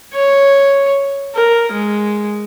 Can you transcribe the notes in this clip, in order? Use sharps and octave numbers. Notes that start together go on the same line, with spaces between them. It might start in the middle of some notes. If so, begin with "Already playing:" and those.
C#5
A#4
G#3